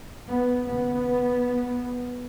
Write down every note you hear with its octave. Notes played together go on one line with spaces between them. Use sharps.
B3
D#2 C#3 B3